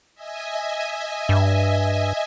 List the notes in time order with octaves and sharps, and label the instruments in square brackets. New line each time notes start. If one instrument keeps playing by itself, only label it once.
[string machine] D#5 E5 G#5
[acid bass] G2